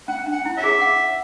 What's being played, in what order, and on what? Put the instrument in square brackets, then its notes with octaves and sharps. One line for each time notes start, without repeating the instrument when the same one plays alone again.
[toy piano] C#4 [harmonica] F#5
[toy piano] C#4
D4
[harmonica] F#5
[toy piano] E4
[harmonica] C#5 E5
[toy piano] G#4
F#5